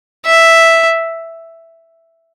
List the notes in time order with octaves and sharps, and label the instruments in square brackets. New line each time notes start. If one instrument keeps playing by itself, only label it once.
[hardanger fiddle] E5